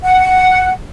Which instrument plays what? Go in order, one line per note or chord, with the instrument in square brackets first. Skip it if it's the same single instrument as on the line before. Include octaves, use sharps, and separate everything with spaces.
[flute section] F#5